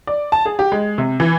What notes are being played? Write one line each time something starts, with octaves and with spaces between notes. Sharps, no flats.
D5
A5
G#4
G4
G#3
C3
E3